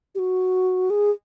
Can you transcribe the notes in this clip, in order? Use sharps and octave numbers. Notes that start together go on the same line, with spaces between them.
G4
F#4
G#4